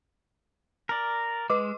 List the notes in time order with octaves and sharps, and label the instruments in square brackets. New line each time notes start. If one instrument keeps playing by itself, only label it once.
[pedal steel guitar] A#4 D5
[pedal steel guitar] G#3 [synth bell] B4 D#5 D6